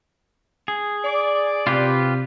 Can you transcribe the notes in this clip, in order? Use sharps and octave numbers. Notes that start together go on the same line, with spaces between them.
G#4
D5
C3 F4 G4 B4